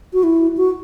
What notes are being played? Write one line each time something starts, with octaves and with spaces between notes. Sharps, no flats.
F#4
E4
F#4